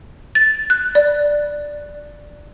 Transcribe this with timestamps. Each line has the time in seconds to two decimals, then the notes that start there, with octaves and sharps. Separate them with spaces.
0.35 A6
0.70 F#6
0.95 D5